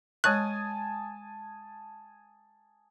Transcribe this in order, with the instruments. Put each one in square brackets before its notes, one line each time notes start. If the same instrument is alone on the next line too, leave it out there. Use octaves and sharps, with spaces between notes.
[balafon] G#3 C#5 C#6 [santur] G#5 A5 D#6 [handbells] F#6